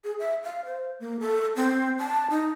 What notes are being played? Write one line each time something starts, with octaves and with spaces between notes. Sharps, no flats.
G#4
E5
F5
C5
A#3
A4
C4
A5
D#4